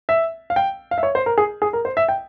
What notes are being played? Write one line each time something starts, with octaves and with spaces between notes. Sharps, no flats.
E5
F5
G5
F5
E5
C#5
C5
A#4
G#4
G#4
A#4
C5
E5
G5